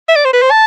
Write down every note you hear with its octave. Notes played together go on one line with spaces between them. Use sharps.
E5
D5
C5
B4
C5
A5